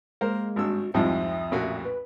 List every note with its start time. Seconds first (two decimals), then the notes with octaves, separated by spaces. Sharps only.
0.21 G#3 A#3 A#4 C5
0.56 G#1 G2 F#4 E6
0.94 C2 F2 G#2 F3 C4 E5 D#6
1.51 A1 A#2 F#4
1.84 B4